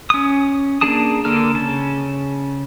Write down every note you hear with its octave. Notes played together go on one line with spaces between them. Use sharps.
C#4 D#6
A#3 D4 G#4 A5 D#6
D3 A#3 A4 F6
C#3 A5